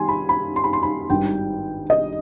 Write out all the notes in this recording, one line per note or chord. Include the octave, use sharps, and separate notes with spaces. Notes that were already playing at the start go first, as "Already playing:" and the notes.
Already playing: D#3 G3 G#5 C6
B5
B5
C6
B5
C6
B5
G#1 G2 D#3 G3 G5
D#5